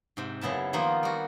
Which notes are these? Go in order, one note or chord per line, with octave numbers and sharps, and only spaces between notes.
G#2 C3
F#2 C#3 B3 E4 A5
D#3 F3 A#3 B3 D#4 F4
G3 F#4